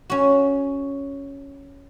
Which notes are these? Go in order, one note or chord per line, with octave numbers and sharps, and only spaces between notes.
C#4 F#4